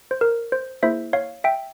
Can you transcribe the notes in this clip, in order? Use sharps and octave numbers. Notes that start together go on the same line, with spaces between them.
C5
A#4
C5
A#3 E4 G#4 C5 E5
C#5 F5
E5 G5